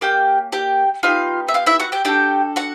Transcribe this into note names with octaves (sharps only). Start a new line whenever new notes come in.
A#3 C#4 G4 G5
G4 G5
B3 D#4 F4 G4 F5
E5
F4 F5
E4 E5
F#4 F#5
G4 G5
D4 F#4 G4 A4 G5
F#4 F#5